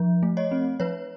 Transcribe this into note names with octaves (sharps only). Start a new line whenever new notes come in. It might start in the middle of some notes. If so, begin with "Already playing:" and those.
Already playing: F3
A3
C#5 D#5
C4
F3 B4 C#5